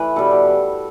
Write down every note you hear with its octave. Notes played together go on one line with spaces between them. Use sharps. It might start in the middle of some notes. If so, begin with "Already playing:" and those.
Already playing: E3 A3 B4
B2 G3 A4
G4